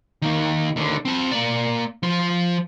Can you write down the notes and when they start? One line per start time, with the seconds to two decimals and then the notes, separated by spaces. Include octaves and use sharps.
0.22 D#3 A#3
0.76 D#2 D3
1.05 C4 A5
1.31 A#3 D5
2.03 F3 F4